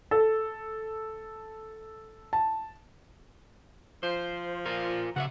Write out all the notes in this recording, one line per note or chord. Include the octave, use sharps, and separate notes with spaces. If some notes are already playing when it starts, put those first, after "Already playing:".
A4
A5
F3 C5
F4 A#4
C#3 B4 E5 F#5